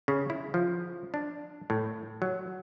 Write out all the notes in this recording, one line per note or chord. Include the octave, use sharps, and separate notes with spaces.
C#3
E4
F3
D4
A2
F#3